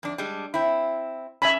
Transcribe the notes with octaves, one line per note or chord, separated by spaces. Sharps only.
F2 D4
G3 G#3 D4
C4 E4
C#4 E5 G#5 B5